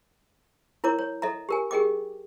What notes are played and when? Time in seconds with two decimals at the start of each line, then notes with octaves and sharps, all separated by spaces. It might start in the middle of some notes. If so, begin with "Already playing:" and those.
0.84 E4 A#4 C#5 A#5 D6
0.99 C#5
1.22 A4 D#5 E5 A#5
1.49 G4 A#4 G#5
1.71 G4 G#4 A#4 D#5 G5 D6